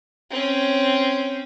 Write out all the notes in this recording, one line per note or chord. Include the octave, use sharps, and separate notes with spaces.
C4 C#4